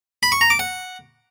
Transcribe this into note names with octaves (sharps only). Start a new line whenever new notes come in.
B5
C#6
A#5
D6
F#5